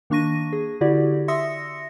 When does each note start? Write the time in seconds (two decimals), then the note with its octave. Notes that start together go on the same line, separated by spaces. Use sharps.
0.10 D#3 A#3 D4 C#6 A#6 D#7
0.53 G#4
0.81 D3 E4 F#4 G4 D5
1.28 E5 C6 D#6 E6 A#6 C#7